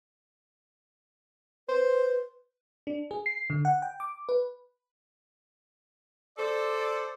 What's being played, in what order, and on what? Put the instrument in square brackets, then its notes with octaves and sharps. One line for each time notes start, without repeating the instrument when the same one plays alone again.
[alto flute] B4 [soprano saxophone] C5
[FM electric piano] D4
G#4
C7
D3
F#5
G5
D6
B4
[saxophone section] A4 [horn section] C5 D5